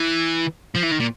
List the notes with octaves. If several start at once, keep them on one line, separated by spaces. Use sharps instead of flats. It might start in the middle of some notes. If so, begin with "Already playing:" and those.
Already playing: E3
F3
E3
D#3
A#2